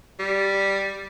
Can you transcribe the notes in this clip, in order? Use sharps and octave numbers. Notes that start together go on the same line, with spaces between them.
G3